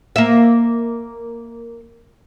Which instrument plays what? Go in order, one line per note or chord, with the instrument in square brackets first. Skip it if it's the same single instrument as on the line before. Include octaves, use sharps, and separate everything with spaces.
[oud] A#3 E5